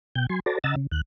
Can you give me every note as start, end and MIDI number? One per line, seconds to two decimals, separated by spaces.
0.15 0.26 47
0.15 0.26 79
0.15 0.26 91
0.29 0.40 54
0.29 0.40 80
0.29 0.40 84
0.46 0.58 66
0.46 0.58 69
0.46 0.58 72
0.46 0.58 74
0.46 0.58 81
0.46 0.58 82
0.64 0.75 49
0.64 0.75 75
0.64 0.75 78
0.64 0.75 82
0.64 0.75 88
0.64 0.75 93
0.76 0.87 49
0.91 1.01 39
0.91 1.01 90